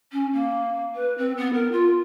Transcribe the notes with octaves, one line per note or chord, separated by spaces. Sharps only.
C#4
A#3
B4
C4
B3
A#4
F4